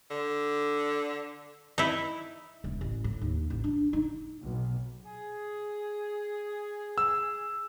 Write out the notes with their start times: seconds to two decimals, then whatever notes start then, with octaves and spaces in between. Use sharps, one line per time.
0.11 D3
1.78 D#4 E4
2.64 E1
2.81 A1
3.04 A2
3.21 D#2
3.50 A1
3.64 D4
3.93 D#4
4.40 B1
5.05 G#4
6.98 E6